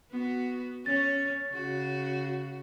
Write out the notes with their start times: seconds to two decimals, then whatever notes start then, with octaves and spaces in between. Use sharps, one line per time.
0.12 B3 F#4
0.86 C#4 C#5 A6
1.52 C#3 F#4